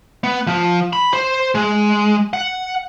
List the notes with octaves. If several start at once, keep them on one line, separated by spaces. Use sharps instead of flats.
B3
F3
B5
C5
G#3
F#5